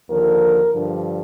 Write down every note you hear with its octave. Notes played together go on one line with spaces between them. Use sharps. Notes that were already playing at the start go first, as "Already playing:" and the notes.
D#2 D3 F3 A#4
G2 D3 F3